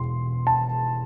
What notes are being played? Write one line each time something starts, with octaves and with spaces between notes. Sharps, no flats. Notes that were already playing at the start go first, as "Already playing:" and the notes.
Already playing: E1 E2 B2 C6
A5